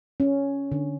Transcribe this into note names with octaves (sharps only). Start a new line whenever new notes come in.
C#4
D3